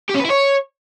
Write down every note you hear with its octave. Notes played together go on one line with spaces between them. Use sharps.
G4
C#4
B4
E4
C#5